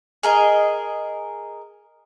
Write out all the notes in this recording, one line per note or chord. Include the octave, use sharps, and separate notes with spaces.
G#4 A#4 D#5